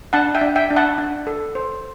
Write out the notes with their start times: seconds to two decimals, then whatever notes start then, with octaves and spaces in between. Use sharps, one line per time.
0.13 D4 F#5 A5
0.35 E5 G5
0.41 D4
0.56 E5 G5
0.70 D4
0.76 F#5 A5
0.98 D4
1.27 A4
1.55 C5